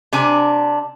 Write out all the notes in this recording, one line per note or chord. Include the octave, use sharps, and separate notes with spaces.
C3 D4 G#5